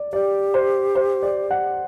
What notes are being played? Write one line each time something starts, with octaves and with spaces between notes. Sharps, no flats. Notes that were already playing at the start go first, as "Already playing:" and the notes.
Already playing: D5
G4 D5
C5
C5
D5
F#5